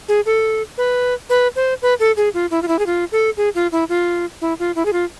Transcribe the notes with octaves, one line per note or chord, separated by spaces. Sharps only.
G#4
A4
B4
B4
C5
B4
A4
G#4
F4
E4
F4
E4
G#4
F4
A4
G#4
F4
E4
F4
E4
F4
E4
G#4
F4